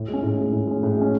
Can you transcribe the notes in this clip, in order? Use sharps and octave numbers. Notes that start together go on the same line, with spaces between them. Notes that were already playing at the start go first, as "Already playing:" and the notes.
Already playing: A2
G#3
C#4
A2
G#3 C#4
A2
G#3 C#4
A2
G#3 C#4